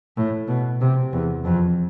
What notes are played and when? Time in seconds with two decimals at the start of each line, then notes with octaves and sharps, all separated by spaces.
0.17 A2
0.48 B2
0.81 C3
1.13 E2
1.45 F2